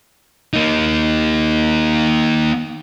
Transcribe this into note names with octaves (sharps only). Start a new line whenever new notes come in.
A#3 D#4